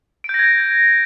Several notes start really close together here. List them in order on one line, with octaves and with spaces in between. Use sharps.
D7 G6 A#6 G#6